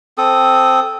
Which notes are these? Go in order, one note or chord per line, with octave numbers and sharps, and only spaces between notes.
C4 A4 D#6